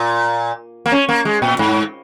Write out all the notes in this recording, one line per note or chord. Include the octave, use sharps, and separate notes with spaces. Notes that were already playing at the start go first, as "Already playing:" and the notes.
Already playing: A#2
A#3
C#4
A#3
G#3
A#2
G#2